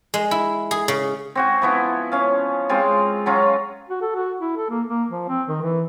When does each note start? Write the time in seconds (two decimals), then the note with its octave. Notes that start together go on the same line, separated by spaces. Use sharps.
0.14 G#3
0.31 E4
0.71 G#4
0.88 C#3
1.35 C4 F#4 G#5
1.62 F3 B3 E4
2.12 C#4 F5
2.69 G#3 C4 F4
3.26 F#3 C#4 F4
3.89 F#4
4.02 A4
4.15 F#4
4.40 E4
4.57 A4
4.70 A#3
4.87 A#3
5.09 F3
5.29 C4
5.47 D#3
5.61 E3